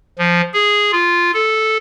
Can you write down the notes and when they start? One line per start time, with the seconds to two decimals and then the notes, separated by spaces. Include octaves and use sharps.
0.19 F3
0.54 G#4
0.92 F4
1.34 A4